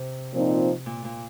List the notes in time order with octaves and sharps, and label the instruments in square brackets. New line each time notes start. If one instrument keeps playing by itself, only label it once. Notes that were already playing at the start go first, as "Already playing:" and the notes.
Already playing: [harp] C3
[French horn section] A#2 F3 C4 D#4
[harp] A#2
A#2